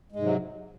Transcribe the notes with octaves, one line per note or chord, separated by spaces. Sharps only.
G#2 C3 F#3 G#3